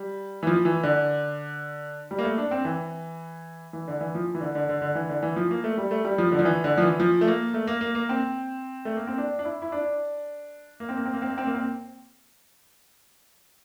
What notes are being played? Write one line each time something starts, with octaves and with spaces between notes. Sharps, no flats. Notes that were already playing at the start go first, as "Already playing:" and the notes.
Already playing: G3
E3
F3
E3
D3
G3
A#3
A3
D4
C4
E3
E3
D3
E3
F3
E3
D3
D3
D3
D3
E3
D3
E3
F3
A#3
A3
G3
A3
G3
F3
D3
F3
E3
D3
F3
E3
F3
A3
A#3
A3
A#3
A#3
A#3
C4
A3
A#3
C4
D4
D4
E4
E4
D4
A#3
C4
A#3
C4
A#3
C4
A#3
C4
A#3
C4